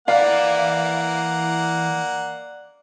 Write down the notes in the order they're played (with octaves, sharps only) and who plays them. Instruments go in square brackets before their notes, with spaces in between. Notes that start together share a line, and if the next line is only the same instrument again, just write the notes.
[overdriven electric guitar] E3 B5 [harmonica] A#3 F#5 [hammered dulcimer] D5 [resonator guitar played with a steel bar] F5